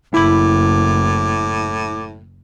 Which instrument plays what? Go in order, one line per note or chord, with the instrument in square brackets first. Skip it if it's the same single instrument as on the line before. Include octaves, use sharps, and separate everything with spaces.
[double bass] F#1 [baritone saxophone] A2 [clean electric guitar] E4 B5 [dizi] D6